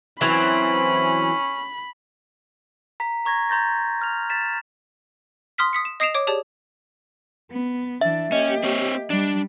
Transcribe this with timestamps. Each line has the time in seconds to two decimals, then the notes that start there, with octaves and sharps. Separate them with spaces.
0.21 E3 F#3 C4 C#4 B5
3.00 A#5 B6
3.25 A#5 C#6 G#6 A#6
3.49 A#5 C6 G6 A6 A#6
4.01 F6 F7
4.30 A6 B6 E7
5.58 C6 D#6 F6 B6
5.73 D#6 B6 C#7
5.85 E7
6.00 D#5 D#6 C7 D7 E7 F7
6.15 C#5 D6 D7
6.27 G4 G#4 C#5 D5 A5
7.51 B3
8.01 E3 D4 E5
8.32 A#3 C#4 G4 D#5
8.64 C4 C#5
9.10 G3 D4